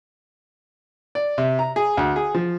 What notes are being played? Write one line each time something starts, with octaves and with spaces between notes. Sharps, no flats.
D5
C3
A#5
G#4
D2
G#4
F3